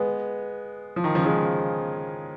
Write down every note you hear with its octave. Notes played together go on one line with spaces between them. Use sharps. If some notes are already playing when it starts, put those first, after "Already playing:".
Already playing: G#3 B3
F3
D#3
C#3 F3
F3 G#3